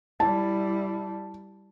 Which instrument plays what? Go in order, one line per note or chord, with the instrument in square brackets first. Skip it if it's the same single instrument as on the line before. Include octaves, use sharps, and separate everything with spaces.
[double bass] G3 E4 [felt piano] A5